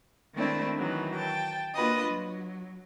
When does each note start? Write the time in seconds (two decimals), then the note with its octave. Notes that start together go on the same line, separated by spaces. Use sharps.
0.34 D#3 G#3 A3 C4 D4 E4
0.78 D#3 E3 F#3 D#4
1.17 G5 A5
1.75 A#3 D4 F4 F#4 B4 D#5
2.07 F#3